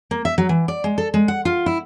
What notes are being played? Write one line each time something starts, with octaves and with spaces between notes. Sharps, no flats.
A#3
E5
F#3
E3
D5
G#3
A4
G#3
F#5
F4
E4